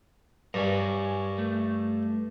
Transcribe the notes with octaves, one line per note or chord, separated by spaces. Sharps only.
G2 A#4 C#5 G#5
A3